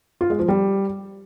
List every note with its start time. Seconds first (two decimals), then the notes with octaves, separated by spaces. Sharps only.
0.21 F4
0.30 G#3
0.39 F3
0.48 G3